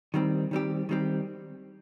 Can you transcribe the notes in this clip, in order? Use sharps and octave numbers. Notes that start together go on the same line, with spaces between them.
D#3 G3 C4 G4
D#3 G3 C4 G4
D#3 G3 C4 G4